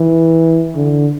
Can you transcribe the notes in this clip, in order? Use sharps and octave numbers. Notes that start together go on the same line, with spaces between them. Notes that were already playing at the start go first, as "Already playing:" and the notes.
Already playing: E3
D3